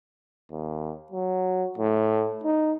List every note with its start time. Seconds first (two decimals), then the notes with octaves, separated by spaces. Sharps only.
0.51 D#2
1.12 F#3
1.78 A2
2.44 D#4